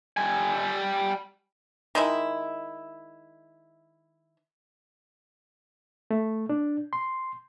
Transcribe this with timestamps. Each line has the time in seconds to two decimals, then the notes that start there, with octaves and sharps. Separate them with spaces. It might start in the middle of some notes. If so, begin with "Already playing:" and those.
0.17 G3 G#5
1.95 D#3 G#3 E4
6.11 A3
6.49 D4
6.93 C6